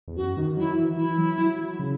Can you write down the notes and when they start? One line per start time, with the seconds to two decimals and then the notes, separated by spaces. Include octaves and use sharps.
0.08 E2
0.16 F#2 F#4
0.37 D#3
0.57 F#3 E4
0.77 E3
0.97 E3 E4
1.18 F#3
1.38 F#3
1.59 F#3
1.79 C#3